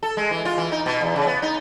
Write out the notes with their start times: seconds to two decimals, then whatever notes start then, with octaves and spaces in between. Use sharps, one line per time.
0.03 A4
0.17 G#3
0.31 E3
0.45 F4
0.58 E3
0.72 D#4
0.86 B2
1.01 E2
1.16 C#3
1.27 B3
1.42 D#4